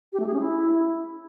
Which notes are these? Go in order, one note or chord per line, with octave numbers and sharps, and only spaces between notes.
G4
A3
G#4
C#4
E4